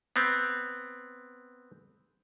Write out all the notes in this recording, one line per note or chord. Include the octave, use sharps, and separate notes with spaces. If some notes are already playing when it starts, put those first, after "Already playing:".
B3 C4